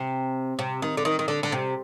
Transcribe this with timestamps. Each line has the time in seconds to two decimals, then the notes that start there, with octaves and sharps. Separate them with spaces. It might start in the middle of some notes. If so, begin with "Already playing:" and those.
Already playing: C3
0.59 C3
0.82 D#3
0.97 D3
1.05 D#3
1.19 D#3
1.28 D3
1.43 D3
1.52 C3